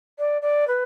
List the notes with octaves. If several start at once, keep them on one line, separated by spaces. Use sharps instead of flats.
D5
D5
B4